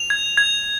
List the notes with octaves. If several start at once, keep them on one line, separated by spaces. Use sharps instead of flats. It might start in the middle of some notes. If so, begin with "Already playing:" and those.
Already playing: F7
G#6
G#6